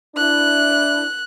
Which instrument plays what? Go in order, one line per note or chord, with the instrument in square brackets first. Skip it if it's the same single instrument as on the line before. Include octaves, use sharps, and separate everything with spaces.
[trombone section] D4 E4 [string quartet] F#6